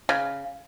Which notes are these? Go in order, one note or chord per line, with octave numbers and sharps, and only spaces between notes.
C#3